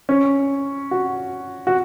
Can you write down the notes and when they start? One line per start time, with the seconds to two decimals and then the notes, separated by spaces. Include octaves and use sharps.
0.09 C#4
0.91 F#4
1.67 F#4